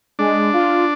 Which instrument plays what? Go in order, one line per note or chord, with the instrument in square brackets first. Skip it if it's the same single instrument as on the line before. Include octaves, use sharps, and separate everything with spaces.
[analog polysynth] G#3 [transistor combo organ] D4
[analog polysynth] F4